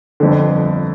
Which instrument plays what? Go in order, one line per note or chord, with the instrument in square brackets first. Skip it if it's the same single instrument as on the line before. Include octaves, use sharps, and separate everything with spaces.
[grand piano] G1 F2 D3